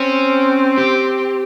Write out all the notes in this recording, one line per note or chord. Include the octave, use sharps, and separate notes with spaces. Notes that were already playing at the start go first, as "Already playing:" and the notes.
Already playing: C4 C#4
G4